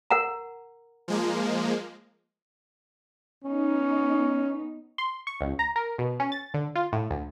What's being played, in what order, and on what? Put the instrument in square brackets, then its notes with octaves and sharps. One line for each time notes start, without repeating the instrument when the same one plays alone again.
[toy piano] A#4 F#5 A#5
[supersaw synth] F3 G#3 A#3
[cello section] B3 D#4 [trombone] C#4
[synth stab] C6
C#6
C#2
A#5
A#4
B2
C#4
A6
D3
F4
A2
D2